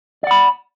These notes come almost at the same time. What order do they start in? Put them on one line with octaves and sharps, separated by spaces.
D5 F#5 B5